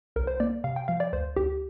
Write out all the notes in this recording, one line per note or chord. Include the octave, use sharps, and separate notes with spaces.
C2 A#4
C5
A#3 D5
C3 F5
G5
F3 F5
D5
D2 C5
D2 G4